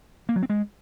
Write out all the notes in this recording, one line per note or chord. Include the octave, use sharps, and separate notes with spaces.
A#3
F#3
C4
G#3